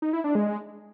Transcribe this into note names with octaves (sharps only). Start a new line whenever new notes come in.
D#4
E4
D4
G#3